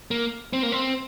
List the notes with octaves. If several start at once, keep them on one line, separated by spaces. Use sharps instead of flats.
A#3
C4
A#3
C4